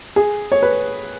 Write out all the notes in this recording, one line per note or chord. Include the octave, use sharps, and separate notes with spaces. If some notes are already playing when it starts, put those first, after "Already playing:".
G#4
C#5
B4